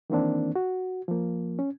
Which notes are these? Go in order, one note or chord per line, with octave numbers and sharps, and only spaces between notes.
D#3 E3 A#3 C4 D4
F#4
F3 A#3
C#4